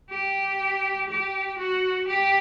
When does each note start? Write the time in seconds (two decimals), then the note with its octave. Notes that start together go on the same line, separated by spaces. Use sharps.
0.11 G4
1.09 G4
1.58 F#4
2.08 G4